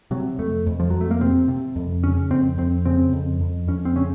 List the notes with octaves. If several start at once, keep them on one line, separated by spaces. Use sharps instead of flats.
C3 F#3
F2 A3
F2
F3
F2 F#3
A3
A#3
C3 C4
C3
F2
C#3 C#4
F2 C4
F2 C4
C#3 C4
F2
F2
F2 C#4
C4
C#3 C#4